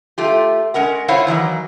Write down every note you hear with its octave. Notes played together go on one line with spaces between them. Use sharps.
A3 F4 G4
G#3 C#4 A#4 F#5
E4 F4 C5 C#5 F5 F#5
D#3 E3 F#3 A#3